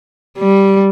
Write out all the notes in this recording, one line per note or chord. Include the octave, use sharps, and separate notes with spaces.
G3